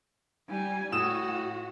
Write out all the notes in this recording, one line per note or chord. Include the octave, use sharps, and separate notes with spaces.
G3 G#5
A2 F#4 D#6 E7